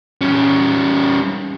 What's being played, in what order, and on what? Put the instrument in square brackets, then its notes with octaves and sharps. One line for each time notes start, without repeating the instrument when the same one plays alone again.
[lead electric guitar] G3 C#4